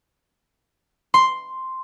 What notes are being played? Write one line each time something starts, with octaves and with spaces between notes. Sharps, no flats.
C6